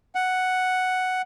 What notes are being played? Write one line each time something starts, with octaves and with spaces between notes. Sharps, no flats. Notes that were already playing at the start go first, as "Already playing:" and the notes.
F#5